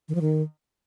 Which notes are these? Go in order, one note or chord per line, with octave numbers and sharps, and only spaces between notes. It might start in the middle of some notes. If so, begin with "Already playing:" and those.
D#3
F3
D#3